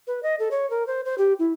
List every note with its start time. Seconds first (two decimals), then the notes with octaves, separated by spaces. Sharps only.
0.07 B4
0.23 D#5
0.39 A4
0.51 C#5
0.70 A#4
0.87 C5
1.05 C5
1.18 G4
1.39 E4